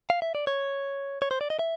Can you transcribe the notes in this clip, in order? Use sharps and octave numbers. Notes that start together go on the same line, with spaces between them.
F5
E5
D5
C#5
C#5
C5
D5
D#5
E5